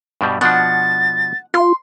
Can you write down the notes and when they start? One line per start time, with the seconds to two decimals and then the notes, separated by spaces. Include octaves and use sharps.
0.21 G2 B2 G3
0.41 B2 F3 D4 F#5 A6
1.54 F4 C6